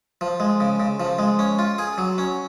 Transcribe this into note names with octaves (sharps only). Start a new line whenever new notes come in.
F3
G#3
C#3
C#3
F3
G#3
C#4
F4
G#4
F#3
C#4